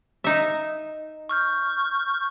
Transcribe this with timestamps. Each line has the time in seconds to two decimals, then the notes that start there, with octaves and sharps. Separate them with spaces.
0.24 D#4 E5
1.29 C#6 F6 G6